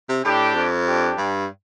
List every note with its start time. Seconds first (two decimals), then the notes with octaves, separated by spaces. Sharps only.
0.09 C3
0.24 A2 D4 G4
0.55 F2
0.87 D4 G4
1.18 G2